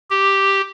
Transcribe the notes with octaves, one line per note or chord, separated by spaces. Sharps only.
G4